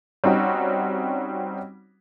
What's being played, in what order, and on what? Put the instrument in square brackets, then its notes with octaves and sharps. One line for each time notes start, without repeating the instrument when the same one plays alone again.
[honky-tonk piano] G3 C4 C#4 D#4 F#4